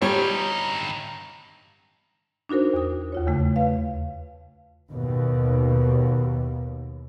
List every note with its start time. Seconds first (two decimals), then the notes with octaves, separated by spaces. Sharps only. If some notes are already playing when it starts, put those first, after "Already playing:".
0.02 G2 G3 D#4 C#5
2.49 D4 D#4 F#4 A#4 C5
2.74 E2 D#6
3.12 D#2 F4 C#5
3.27 E2 C#3 A3
3.56 A3 B4 F5
4.90 D#2 B2